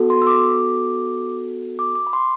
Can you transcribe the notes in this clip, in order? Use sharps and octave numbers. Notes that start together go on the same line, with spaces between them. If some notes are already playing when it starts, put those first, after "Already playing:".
Already playing: B3 F#4 A4
C6
E6
D6
D6
D6
B5
C6